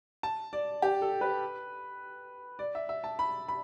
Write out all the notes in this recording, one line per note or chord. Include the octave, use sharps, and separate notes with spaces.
A5
D5
G4
A4
B4
D5
E5
E5
A5
B5
B5